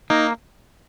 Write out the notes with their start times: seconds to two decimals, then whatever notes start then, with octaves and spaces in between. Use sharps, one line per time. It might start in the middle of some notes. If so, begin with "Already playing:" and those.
0.10 A#3 D#4